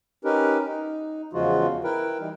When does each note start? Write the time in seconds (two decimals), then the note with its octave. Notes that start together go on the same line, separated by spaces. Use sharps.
0.25 C#4 D#4 G4 A#4 B4
0.67 D#4
1.33 E2 C#3 F3 G#3 F4 F#4
1.84 E4 A#4 B4 G5
2.19 E3 G3 D#4